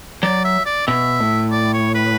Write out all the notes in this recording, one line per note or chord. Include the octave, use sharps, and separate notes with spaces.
F#3 D5
E5
D5
B2 E5
A2
D5
C#5
B4